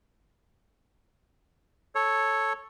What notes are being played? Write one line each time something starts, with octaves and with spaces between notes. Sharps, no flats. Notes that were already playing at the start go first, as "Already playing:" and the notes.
A4 C#5